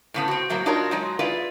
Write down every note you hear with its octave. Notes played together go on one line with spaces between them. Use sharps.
A2 C#3 B3
C4 F#4
A2 F#3 A#3
D4 D#4 F4 F#4 A#4 C#5
F#3 G#3 D#4
E4 F4 G#4 B4 D5